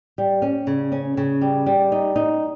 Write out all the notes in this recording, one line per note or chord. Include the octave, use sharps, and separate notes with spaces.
G3
C#4
C#3
C#4
C#3
G3
G3
D#4
D#4